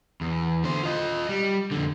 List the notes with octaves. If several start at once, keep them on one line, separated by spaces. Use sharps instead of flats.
E2
D3 C5
F4 D#5
G3
F2 D3